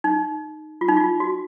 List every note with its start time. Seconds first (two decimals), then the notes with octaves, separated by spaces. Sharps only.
0.04 D#4
0.81 F4
0.88 D#4
0.96 F4
1.20 F#4